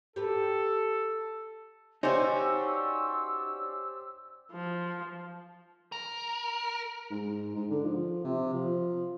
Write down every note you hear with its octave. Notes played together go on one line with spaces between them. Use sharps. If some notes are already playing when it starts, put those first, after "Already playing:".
G4 A4 B4
C#4 D#4 F#4 G4 C5 D5 E6
F3
A#4
G#2
G#2
D3
F3
C3
F3